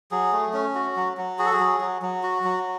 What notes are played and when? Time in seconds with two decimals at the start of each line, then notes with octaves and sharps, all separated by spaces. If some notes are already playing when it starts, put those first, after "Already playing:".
0.11 F#3 G#4
0.33 A3
0.53 C#4
0.75 F#4
0.96 F#3
1.17 F#3
1.39 F#4 G#4
1.46 A4
1.53 G#4
1.60 F#3
1.81 F#3
2.02 F#3
2.23 F#4
2.44 F#3